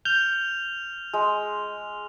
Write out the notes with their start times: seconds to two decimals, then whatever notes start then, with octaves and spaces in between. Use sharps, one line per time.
0.05 F6 G6 F7
1.13 G#3